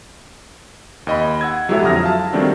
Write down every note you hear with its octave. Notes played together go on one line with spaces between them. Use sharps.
D#2 D#5 B5
F#5 E6 G#6
F#3 G#3 E4 G4 A4 E5
F2 D3 F#3 D#6 F6 A#6
E5 F5 A5
D#3 F#3 G3 A3 C4 D4